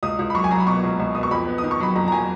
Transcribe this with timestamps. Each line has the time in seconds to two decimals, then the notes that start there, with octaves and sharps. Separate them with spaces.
0.03 C#2 D#6
0.19 C#2
0.30 B5
0.35 F#3 C#6
0.44 G#5
0.51 F#3 A#5
0.60 B5
0.67 B2 C#6
0.83 C#2
0.99 C#2
1.15 B2 D#6
1.23 C#6
1.31 F2 B5
1.48 B3
1.58 D#6
1.63 D#3
1.71 C#6
1.80 F#3 B5
1.96 F2 A#5
2.08 A#5
2.12 F#3 G#5